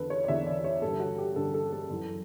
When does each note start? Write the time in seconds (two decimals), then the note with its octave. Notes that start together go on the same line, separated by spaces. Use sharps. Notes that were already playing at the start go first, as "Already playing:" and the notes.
Already playing: E2 D3 A4 B4
0.10 C#5
0.24 D5
0.28 E2 D3 E5
0.46 D5
0.64 C#5
0.82 G2 D3 A4
1.00 F#4
1.18 G4
1.36 G2 D3 A4
1.54 A4
1.73 A4
1.90 F#2 E3